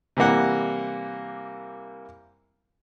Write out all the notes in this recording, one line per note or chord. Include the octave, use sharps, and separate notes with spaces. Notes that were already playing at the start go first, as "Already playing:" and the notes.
C3 E3 G3 A#3 F#5